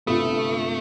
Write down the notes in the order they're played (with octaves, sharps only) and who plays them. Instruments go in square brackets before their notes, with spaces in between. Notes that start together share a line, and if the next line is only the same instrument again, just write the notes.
[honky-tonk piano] G1 C3 F4 [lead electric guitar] A3 [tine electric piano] A4 B5 D#6